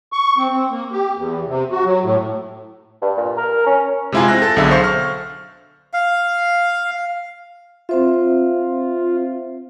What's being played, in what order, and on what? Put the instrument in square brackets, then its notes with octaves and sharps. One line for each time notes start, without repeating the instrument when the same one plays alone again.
[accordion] C#6
C4
C4
A#3
G4
E2
C3
F#4
F#3
A2
[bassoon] G2
A#2
A#4
C#4
[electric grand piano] C3 G#3 E4 F4 G#5
C4 F#6 A#6
A4 A6
B1 D3 G#4 E5
C5 F5 C#6
F6
[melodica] F5
[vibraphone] C4 C5 E5 [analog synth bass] F4